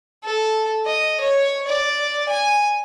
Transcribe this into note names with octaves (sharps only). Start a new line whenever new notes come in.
A4
D#5
C#5
D5
G#5